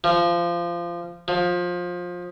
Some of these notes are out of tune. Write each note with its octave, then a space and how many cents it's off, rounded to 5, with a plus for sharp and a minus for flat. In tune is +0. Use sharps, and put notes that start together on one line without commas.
F3 -20
F3 +20